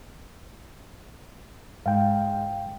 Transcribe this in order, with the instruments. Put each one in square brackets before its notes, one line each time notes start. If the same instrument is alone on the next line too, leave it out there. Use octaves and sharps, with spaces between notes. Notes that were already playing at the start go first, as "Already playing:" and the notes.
[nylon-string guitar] G#2 [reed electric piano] F5 G5